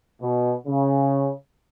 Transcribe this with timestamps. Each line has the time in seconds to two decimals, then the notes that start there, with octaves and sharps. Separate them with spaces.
0.22 B2
0.67 C#3